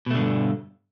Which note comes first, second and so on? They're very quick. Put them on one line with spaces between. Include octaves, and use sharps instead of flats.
B2 A3 D3 G2